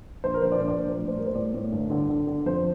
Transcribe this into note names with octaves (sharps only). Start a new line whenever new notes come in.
A#1 C5
A#4
A#1 C5
D5
A#1 C5
D5
A#1
A2
C5
G3 A#4
C5
A2 D5
A2
G1
D3
D3
D3
F2 C5